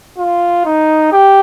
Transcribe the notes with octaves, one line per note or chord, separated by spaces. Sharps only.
F4
D#4
G4